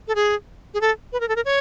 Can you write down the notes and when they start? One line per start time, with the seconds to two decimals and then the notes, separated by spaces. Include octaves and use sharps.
0.08 A4
0.15 G#4
0.74 G#4
0.81 A4
1.13 B4
1.20 A#4
1.29 A4
1.36 A#4
1.45 C#5